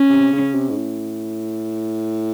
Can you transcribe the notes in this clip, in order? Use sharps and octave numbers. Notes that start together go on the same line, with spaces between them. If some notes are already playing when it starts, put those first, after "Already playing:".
Already playing: C#4
C3
C#3
C3
G#2
A2